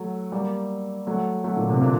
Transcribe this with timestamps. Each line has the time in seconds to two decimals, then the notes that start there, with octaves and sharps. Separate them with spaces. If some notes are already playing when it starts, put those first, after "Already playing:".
Already playing: F#3 A3
0.32 G3 A#3
1.07 F#3 A3
1.44 F#3 A3
1.56 A#2 D3
1.69 C3
1.81 A#2 D3